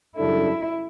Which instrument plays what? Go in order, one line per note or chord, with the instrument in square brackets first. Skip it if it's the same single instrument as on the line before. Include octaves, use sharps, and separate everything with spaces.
[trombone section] F#2 C#3 G3 D4 A4 [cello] E4